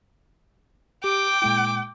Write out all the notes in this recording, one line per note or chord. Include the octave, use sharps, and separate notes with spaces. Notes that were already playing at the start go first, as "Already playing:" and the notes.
G4 G5 D6
A#2 G#3 E4